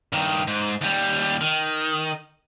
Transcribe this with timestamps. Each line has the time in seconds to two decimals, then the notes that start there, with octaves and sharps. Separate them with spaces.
0.12 G2 D#3
0.48 G#2
0.81 D#2 G3
1.41 D#3